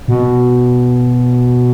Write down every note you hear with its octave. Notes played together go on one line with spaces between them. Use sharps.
B2